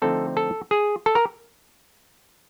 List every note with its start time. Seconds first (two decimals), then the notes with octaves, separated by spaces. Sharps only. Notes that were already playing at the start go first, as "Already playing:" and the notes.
0.02 D3 F3 A3 C4 D#4 A4
0.37 A4
0.71 G#4
1.06 A4
1.15 A#4